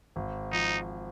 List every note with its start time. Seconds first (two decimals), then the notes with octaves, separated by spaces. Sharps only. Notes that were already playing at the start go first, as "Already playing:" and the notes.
0.16 G#1
0.52 F3 D#4